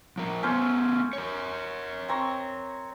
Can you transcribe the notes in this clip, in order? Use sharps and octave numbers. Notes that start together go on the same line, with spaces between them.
F3 A#4
A3 B3 C#4 A4 C5
A#4 C#5
C4 A#5 C#6